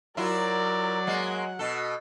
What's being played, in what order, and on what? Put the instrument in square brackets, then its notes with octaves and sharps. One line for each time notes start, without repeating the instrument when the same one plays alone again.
[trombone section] F#3 [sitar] E4 F4 [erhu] A#4 [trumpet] D5
[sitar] G#3 A#3 [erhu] F#5
[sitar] B2 A4 [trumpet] F#4